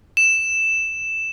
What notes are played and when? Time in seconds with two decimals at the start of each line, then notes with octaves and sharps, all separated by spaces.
0.17 E7